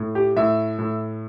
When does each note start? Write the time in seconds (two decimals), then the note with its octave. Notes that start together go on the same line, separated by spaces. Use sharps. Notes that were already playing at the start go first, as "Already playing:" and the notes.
Already playing: A2
0.15 G4
0.36 A2 E5
0.79 A2